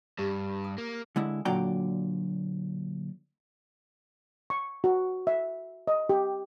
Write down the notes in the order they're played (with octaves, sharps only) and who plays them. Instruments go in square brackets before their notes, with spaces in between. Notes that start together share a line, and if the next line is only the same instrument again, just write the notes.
[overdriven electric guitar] G2 [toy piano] G4
[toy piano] D#6
[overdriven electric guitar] A#3
[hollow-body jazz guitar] D3 G#3 E4
A#2 D3 F#3 D5 G5 A#5
[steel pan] C#6
F#4
E5
D#5
G4